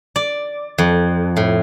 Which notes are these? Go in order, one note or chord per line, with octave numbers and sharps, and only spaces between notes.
D5
F2
A2